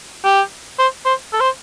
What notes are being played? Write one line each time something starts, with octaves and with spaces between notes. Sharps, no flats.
G4
C5
C5
A4
C5